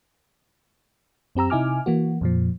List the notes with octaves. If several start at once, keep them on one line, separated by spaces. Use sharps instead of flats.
F#2 C4 G4 A#5 E6
C3 D#4 E4 G#5 D6 F6
E3 A#3 F#4
F2 A#2 F3